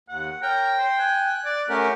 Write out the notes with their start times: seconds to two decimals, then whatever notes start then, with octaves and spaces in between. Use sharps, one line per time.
0.09 D#2 F#5
0.42 A#4 C#5 G5
0.78 C5
0.98 G#5 F#6
1.45 D5
1.69 A3 C#4 G4 A#4 F#5